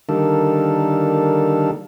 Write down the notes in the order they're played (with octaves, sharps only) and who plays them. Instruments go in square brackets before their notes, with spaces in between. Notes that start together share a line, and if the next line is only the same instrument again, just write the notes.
[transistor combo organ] D3 D#3 G3 A#3 A4